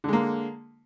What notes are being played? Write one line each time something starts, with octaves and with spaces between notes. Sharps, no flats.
D3 G#3 A#3